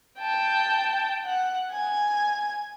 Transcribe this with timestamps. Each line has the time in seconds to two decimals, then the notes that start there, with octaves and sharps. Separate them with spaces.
0.19 G5 A5
1.25 F#5
1.72 G#5